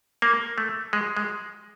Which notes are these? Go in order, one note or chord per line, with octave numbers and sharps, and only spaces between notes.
A#3
A3
G#3
G#3